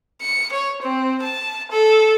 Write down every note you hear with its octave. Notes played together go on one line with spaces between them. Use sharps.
C#7
C#5
C4
A5
A4